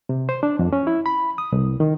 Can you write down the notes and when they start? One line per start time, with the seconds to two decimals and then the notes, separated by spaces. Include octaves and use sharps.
0.09 C3
0.29 C5
0.43 D4
0.59 F2
0.73 C#4
0.87 E4
1.06 B5
1.38 D#6
1.52 C2
1.80 D#3